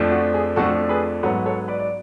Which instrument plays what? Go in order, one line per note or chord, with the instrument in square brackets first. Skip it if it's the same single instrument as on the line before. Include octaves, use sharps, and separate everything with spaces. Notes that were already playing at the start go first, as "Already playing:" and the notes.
Already playing: [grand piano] F2 F3 A3 D4
F#4
G#4
F2 F3 A3 D4 F#4 A4
G#4 B4
G#2 F#3 B3 A4 C#5
A4 C#5
B4 D5
D5